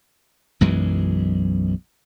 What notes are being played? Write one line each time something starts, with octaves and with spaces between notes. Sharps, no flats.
B1 F#2 E3 G#3